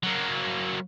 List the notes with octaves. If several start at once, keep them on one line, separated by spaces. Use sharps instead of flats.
F#3 A#3